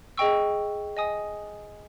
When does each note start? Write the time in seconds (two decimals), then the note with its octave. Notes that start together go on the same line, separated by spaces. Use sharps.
0.18 G#4 D#5 G5 C#6 E6
0.97 D#5 G#5 D#6